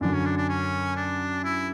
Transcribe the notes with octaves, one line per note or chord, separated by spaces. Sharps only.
F#2 D3 F#3 D4
C#4
D4
D4
C#4
D4
E4